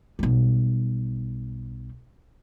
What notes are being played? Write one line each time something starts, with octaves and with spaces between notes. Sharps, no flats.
B1 G3